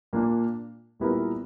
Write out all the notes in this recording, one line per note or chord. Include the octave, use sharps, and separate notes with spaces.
A#2 A#3 D4
A#2 G3 B3 E4 A#4